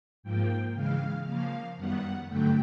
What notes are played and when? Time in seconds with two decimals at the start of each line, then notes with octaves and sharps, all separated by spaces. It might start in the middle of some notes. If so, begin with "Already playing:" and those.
0.23 G#2 F3 A#3 G5
0.75 C#3 E3 G#3 F5
1.26 C#3 F3 A#3 F5
1.77 F#2 D#3 G3 B3 F#5
2.28 G2 D3 F#3 A3 G5